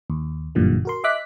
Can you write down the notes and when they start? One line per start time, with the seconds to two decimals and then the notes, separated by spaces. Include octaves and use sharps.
0.10 D#2
0.55 G1 F#2 A#2 D3 E3 G3
0.85 F#4 A#4 C6
1.04 D#5 E5 D6 F#6 B6